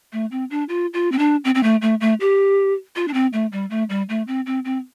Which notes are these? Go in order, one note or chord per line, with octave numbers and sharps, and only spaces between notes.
A3
C4
D4
F4
F4
C4
D4
C4
C4
A3
A3
A3
G4
F4
D4
C4
A3
G3
A3
G3
A3
C4
C4
C4